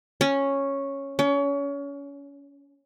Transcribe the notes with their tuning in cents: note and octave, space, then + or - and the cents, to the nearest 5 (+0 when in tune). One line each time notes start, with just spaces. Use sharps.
C#4 -5
C#4 +30